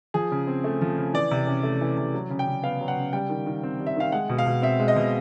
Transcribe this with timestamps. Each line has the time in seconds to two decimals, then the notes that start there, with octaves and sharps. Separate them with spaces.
0.14 F3 G#4
0.31 C#3
0.47 C4
0.64 A3
0.82 F3
0.98 C#3
1.14 E3 D5
1.31 C3
1.47 C#4
1.63 A3
1.81 E3
1.97 C3
2.14 F#3
2.30 C#3
2.39 G5
2.47 C#3
2.63 B3 F5
2.81 F#3
2.88 F#5
2.97 C#3
3.13 G3 G5
3.30 D#3
3.46 D#3
3.63 C4
3.80 G3
3.87 E5
3.96 D#3 F5
4.12 G#3 F#5
4.30 B2
4.38 F5
4.46 B2
4.62 C4 E5
4.80 G#3
4.88 D#5
4.96 B2